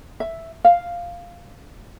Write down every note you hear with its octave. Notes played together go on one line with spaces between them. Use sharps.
E5
F5